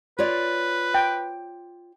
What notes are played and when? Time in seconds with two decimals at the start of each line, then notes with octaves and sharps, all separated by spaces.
0.19 F4 B4 C#5 D5
0.94 G5